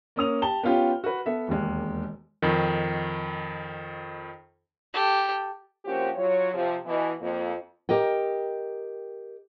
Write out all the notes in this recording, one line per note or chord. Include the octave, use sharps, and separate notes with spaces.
A#3 C#4 D#6 F7
G4 A5 G7
B3 C#4 F4 G4
F#4 B4
B3 A4 E5
E1 D#2 G#3
F2 D#3
G4 A4
F3 A#3 C4 C#4 F#4 G4
F#3 F4 C#5
C3 F3
B2 E3
F2 A#3
G4 A#4 D#5 G5